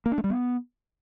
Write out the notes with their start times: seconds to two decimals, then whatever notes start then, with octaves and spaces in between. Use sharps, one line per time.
0.06 A#3
0.12 D4
0.18 A3
0.24 G3
0.30 B3